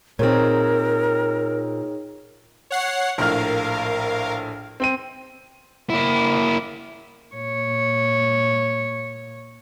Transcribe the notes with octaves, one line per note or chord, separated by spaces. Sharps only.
A#2 C4 D#4 G#4 A#4 C#5
C#5 F#5 C7
A#1 A2 A#4 F5 F6
C4 G5 D#7
A#3 E4
A#2 C#5